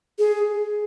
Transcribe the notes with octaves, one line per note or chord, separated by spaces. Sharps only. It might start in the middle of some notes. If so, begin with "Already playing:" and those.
G#4